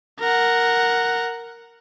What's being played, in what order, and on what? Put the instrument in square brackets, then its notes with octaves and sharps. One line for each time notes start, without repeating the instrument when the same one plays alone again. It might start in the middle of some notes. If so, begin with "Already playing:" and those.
[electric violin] A#4 F#5